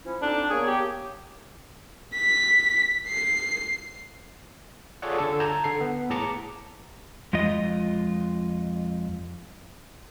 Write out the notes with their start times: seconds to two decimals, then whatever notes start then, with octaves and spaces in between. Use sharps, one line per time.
0.04 F3 C#4 E4
0.22 D3 C4 D4 D#4
0.50 A#3 B3 G#4 C#5
0.67 G4
2.14 B6
3.08 C7
5.02 F4 G#4 A4 C#5 D5 F#5
5.18 D3 A4
5.40 A5 A#5 G6 G#6
5.64 D3 A4 C7
5.81 B3
6.10 A2 G#4 A5 A#5 D6 C#7
7.33 F2 G#3 F4 D#5